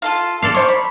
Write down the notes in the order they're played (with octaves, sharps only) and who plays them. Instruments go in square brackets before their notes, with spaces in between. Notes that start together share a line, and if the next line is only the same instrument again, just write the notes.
[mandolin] F4 A4 F5
[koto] A4 D5 F5
[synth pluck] C5 C6 [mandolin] C#5 F6
[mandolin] B5